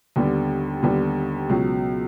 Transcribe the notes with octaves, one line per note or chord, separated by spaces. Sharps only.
D#2 D3 G3 B3
D#2 D3 G3 B3
C#2 B2 F#3